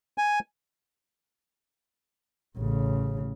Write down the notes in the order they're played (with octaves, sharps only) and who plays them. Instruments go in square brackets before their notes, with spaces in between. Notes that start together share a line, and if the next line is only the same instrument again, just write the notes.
[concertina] G#5
[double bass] A1 C#3